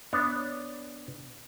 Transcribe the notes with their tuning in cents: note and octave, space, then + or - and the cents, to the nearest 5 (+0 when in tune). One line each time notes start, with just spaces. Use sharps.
B3 +0 D4 +0 C#5 +0